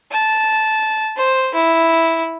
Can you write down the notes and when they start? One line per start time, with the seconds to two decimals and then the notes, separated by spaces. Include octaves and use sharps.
0.12 A5
1.16 C5
1.54 E4